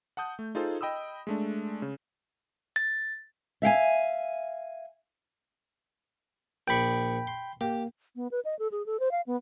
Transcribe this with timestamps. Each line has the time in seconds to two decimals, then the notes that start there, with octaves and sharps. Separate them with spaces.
0.17 F#5 A5 D#6 G6
0.39 A3
0.55 D#4 F4 G#4 A4 C5
0.81 D#5 G5 B5 D#6 E6
1.27 G#3 A3 D4
1.82 C#3
2.76 A6
3.62 E5 F5 G5 G#5
6.68 A#1 D5 G5 B5 C#6
7.27 C6
7.61 A#3 G4
8.16 B3
8.31 B4
8.45 D#5
8.59 A4
8.72 G#4
8.86 A4
9.00 C5
9.11 F5
9.27 B3